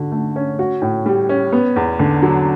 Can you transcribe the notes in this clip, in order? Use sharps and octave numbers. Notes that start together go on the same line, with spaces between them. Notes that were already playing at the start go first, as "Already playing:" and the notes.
Already playing: D3 F#4
A3
C#4
F#4
A2
G3
C#4
B3
E2
D3
F#3